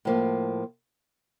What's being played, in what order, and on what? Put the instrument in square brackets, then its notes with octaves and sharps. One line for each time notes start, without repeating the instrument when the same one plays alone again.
[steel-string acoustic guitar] A2 F3 A#3